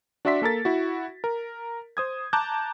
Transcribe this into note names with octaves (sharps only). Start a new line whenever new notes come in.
D4 F#4 D5 E5 C6 B6
A#3 A4 A#4 A6
E4 F#4
A#4
C5 D#6 G#6
A5 A#5 D6 F#6 G6